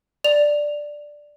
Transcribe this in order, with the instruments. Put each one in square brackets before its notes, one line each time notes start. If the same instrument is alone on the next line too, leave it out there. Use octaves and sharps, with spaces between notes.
[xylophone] D5 F7